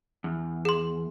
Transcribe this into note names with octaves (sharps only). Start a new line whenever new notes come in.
E2
G#4 C6